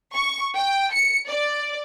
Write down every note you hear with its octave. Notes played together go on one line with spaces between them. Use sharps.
C#6
G5
C#7
D5